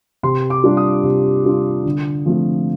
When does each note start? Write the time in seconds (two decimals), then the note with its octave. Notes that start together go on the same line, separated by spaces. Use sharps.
0.23 C3 C6
0.50 D6
0.64 G3 D4 F4
0.77 D#6
1.04 C3
1.45 G3 D4 F4
1.85 D3
2.26 F3 A3 C4 F4